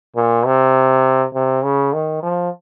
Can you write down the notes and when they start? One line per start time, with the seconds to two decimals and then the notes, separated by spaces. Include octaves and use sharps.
0.16 A#2
0.46 C3
1.34 C3
1.64 C#3
1.93 D#3
2.23 F3